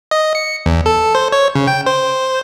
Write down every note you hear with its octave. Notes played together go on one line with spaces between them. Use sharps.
D#5
C#7
E2
A4
C5
C#5
C#3
G5
C5